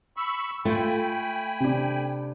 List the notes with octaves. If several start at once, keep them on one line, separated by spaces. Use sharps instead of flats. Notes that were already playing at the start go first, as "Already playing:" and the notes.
B5 C#6 E6
A3 F4 G5 G#5 B5
C3 D4